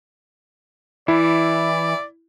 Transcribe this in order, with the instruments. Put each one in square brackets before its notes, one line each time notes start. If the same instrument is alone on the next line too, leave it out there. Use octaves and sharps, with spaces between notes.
[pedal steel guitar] E3 [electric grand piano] E4 [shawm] D5